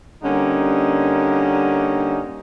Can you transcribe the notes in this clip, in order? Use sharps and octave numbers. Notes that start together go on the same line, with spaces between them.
D3 G3 A#3 C#4 D#4